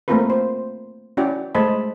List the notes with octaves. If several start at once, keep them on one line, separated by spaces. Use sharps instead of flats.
A3 A#3 C4 F4 A#4 B4
C5
C#4 E4 F#4 D5 G5
G#3 A3 C5 D#5 A5 B5